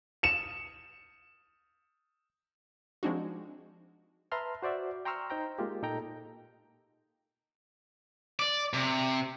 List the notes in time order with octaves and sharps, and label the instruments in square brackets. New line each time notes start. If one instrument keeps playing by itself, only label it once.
[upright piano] C#7 E7
[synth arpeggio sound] F3 G#3 C4 D4 D#4 F#4
[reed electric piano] B4 E5 A5 A#5 C6 F6
F#4 C5 D5 E5
G5 A#5 C6 C#6 E6 F6
D#4 C5 G5 A#5
G#3 A#3 F4 G4
A#2 D#4 A4 G5 A#5
[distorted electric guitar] D5
C3